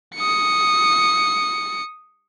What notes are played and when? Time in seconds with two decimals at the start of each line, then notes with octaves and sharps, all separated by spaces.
0.16 D#6 C#7